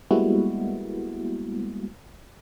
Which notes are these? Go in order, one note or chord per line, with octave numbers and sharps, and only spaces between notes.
G3 G#3 A#3 B3 E4 F#4